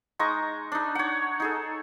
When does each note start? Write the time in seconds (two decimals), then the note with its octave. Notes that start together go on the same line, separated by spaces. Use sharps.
0.19 G#3 D#4 A#5 C#6
0.72 D4 D#4
0.95 C#5 F#5
1.40 D#4 G#4 A4